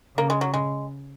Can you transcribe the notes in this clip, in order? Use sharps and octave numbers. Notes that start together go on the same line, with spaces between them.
C#3 A#3
G#3
F#3
G#3